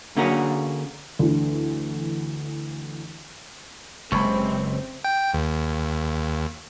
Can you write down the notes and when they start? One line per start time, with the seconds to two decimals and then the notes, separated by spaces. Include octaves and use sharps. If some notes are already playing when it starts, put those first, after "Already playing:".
0.16 D3 A#3 C#4 F#4 G#4 A#4
1.19 D2 E3
4.12 F#1 C#2 C3 G#3 C4 B5 C#6
5.05 G5
5.34 D#2